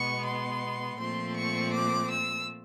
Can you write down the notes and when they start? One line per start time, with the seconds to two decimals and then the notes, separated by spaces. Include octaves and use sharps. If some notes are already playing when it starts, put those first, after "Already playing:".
Already playing: B2 G#3 B3 C#6
0.26 C6
0.99 A#2 F3 A3 C4 C6
1.37 C#6
1.74 D6
2.10 E6